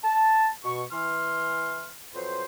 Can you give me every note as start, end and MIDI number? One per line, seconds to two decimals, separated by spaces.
0.04 0.49 81
0.64 0.84 47
0.64 0.84 85
0.92 1.90 52
0.92 1.90 84
0.92 1.90 89
2.14 2.43 41
2.14 2.43 54
2.14 2.43 71
2.14 2.43 72